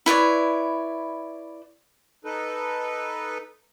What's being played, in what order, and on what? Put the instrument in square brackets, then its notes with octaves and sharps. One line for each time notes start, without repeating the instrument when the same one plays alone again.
[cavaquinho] E4 B4 C#5 D5
[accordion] D#4 A4 B4